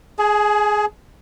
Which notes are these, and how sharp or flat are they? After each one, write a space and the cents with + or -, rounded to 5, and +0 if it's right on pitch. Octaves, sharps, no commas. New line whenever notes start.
G#4 +5 G#5 +45